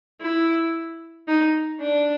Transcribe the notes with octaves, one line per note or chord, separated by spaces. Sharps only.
E4
D#4
D4